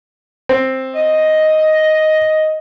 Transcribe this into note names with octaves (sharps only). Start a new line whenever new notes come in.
C4
D#5